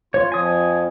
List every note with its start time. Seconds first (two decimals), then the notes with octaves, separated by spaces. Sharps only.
0.14 F4 C#5
0.32 F2 F3 G#5 D#6